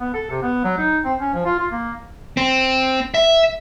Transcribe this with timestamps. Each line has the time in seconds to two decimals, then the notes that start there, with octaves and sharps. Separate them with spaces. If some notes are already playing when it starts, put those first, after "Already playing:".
0.01 B3
0.14 A4
0.30 C3
0.42 B3
0.64 F#3
0.78 D#4
1.05 C4
1.20 C#4
1.34 F3
1.45 F4
1.59 F4
1.71 A#3
2.37 C4
3.14 E5